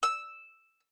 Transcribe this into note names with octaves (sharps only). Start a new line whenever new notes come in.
E6